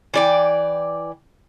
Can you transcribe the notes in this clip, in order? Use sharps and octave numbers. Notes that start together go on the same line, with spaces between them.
E3 D5 G5